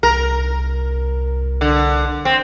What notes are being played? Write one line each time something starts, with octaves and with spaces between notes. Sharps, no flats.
C2 A#4
D3
C4